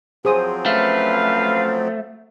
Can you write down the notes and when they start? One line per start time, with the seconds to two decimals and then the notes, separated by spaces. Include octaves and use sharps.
0.25 F3 F#3 C4 G#4 C5 D#6
0.66 A3 C#4 B4 F5